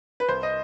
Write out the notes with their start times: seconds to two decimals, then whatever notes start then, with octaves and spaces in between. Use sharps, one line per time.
0.20 B4
0.28 C2 C5
0.43 D#5